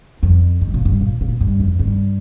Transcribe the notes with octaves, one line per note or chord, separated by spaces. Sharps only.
F2
G2
A#2
G2
A#2
A#2
G2
F2
G2